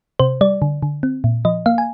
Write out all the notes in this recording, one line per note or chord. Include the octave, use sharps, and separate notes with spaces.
C3 C5
G3 D5
D3
D3
C4
A#2
F3 D#5
A#3 F5
G#5